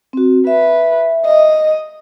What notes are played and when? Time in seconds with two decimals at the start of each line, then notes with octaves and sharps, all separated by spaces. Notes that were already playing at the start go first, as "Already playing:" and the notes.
0.13 C4 F#4
0.47 B4 E5
1.26 D#5